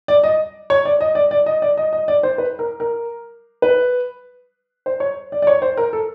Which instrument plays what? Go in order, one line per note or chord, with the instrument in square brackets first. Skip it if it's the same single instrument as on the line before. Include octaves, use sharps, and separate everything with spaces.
[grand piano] D5
D#5
C#5
D5
D#5
D5
D5
D#5
D5
D#5
D#5
D5
C5
B4
A#4
A#4
B4
C5
C#5
D5
D5
C#5
C5
A#4
A4